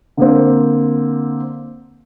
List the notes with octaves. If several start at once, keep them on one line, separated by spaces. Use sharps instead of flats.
D3 A#3 C4